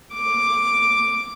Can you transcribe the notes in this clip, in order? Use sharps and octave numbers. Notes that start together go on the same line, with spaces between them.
D6